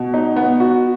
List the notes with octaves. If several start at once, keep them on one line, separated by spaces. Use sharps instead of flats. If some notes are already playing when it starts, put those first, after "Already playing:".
Already playing: B2
D#4
B3
F#4